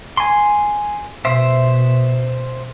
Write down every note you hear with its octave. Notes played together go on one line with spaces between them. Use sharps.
G#5 C6
B2 C5 E5